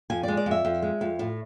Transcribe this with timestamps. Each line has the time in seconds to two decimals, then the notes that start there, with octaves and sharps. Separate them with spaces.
0.10 F2 G#5
0.23 G#3 D5
0.37 D5
0.46 F2 E5
0.65 F2
0.82 G#3
1.01 F2
1.19 A2